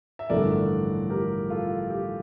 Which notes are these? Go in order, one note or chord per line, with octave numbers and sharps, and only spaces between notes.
E5
A1 G2 D3 F3 A3 A#4 D5
G4 A#4
F4 A4
G4